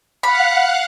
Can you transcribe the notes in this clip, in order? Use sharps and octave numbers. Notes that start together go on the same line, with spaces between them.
F5 F#5 B5 F#6